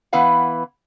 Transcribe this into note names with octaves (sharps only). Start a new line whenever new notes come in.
E3 B3 E4 B4 F5 F#5